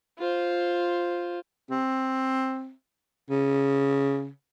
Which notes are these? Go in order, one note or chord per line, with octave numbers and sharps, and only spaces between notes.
F4 C5
C4
C#3